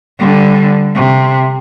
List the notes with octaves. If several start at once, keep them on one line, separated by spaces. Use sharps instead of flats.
D3 G3
C3